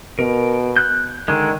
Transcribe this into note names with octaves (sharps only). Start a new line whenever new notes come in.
B2 A#4
F#6 G6
D3 D#3 G#3